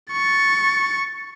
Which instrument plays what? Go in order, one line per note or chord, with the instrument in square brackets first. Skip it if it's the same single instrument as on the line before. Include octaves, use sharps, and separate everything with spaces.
[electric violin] C#6 A6